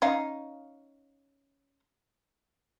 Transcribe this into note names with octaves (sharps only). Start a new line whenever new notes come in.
C#4 D#4 F5